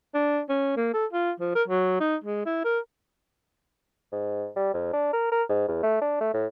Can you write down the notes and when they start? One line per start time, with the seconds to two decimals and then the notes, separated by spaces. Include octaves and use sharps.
0.14 D4
0.49 C#4
0.77 A#3
0.94 A4
1.13 F4
1.40 F3
1.55 A#4
1.68 F#3
2.00 D#4
2.24 G#3
2.46 E4
2.65 A#4
4.12 G#2
4.56 G3
4.74 F2
4.93 D4
5.13 A#4
5.32 A#4
5.49 G#2
5.68 E2
5.83 A3
6.01 D4
6.20 A3
6.34 A2